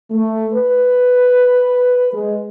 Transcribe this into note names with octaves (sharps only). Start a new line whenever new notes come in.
A3
B4
G#3